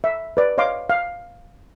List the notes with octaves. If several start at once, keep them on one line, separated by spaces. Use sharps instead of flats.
E5
B4 D5
C#5 D#5 F5 C6 D6
F5